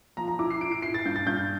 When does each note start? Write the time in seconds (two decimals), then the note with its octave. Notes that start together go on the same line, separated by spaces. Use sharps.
0.17 F3 A#5
0.28 A#5
0.39 E4 D6
0.50 C7
0.61 E4 D7
0.72 D7
0.82 E4 C7
0.94 A6
1.05 G2 G6
1.16 A6
1.26 G2 G6